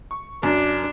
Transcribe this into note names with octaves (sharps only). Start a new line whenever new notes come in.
C#6
F#2 D4